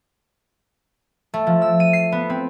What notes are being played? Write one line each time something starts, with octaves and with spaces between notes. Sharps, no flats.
A3
F3
E6
D#7
C7
B3
C4